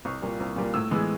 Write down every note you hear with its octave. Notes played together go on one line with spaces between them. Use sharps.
C2 C#6
A#2 G3 A#3
C2
A#2 G3 A#3
A2 E6
E3 G#3 B3